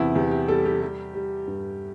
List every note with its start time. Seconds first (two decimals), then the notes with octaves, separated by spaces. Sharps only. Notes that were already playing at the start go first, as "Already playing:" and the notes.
Already playing: E2 C3 E4
0.16 E2 G4
0.31 G4
0.48 G3 A4
0.65 G4
0.82 G3
1.15 G3
1.47 G2